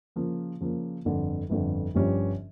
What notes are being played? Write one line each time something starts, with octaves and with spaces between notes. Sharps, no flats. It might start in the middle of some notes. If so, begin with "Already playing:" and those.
C#3 F3 A#3
C#3 F3 A#3
G1 F2 D3
G1 F2 D3
G1 G2 F3 C#4 G4